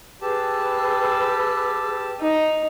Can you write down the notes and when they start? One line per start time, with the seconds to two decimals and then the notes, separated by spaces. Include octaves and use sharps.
0.21 G4 G#4 B4 A5 E6
2.20 D#4